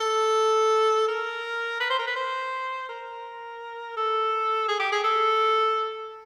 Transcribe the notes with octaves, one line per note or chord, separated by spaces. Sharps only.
A4
A#4
B4
C5
A#4
B4
C5
A#4
A4
G#4
G4
G#4
A4